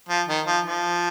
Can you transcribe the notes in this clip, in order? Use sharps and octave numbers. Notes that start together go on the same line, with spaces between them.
F3
D#3
F3
F3